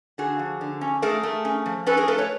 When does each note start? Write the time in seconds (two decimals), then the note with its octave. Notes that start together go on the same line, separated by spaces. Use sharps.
0.18 D3 F#4 G#4
0.39 F3
0.61 D3
0.81 C#4
1.02 A3 G#4 A#4
1.23 A3
1.45 C#4
1.66 F3
1.86 C#4 A4 B4
1.97 G#4 A#4
2.08 A3 A4 B4
2.18 B4 C#5